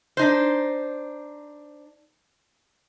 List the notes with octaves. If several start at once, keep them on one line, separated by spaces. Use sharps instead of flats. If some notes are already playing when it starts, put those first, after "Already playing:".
D4 D#4 C5